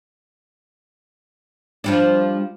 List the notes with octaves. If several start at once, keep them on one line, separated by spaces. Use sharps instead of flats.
F3 G3 D4